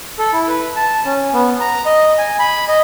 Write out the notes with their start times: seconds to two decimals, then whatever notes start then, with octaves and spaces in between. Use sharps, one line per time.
0.18 A4
0.33 E4
0.48 B4
0.76 A5
1.05 C#4
1.33 B3
1.61 A#5
1.86 D#5
2.18 G#5
2.39 B5
2.68 D#5